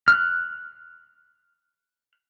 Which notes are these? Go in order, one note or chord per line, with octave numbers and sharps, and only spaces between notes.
F6 F#6